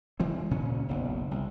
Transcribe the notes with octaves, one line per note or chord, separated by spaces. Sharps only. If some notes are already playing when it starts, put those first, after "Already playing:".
E3 G#3 C4
D2 A#2 C#3 C#4
F#1 B1
C2